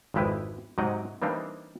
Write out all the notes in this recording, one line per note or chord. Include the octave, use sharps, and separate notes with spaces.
G#1 F2 G#3 E4 G4 B4
G#2 C3 F#3 D#5 F#5 G5
E3 G3 A#3 C4 D4 D#4